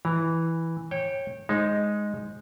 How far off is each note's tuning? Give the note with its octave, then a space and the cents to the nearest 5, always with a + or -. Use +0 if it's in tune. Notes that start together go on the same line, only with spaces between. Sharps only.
E3 -5 A#5 +0
C#5 -25 G5 +0
G#3 +0 D#4 +0 C5 +20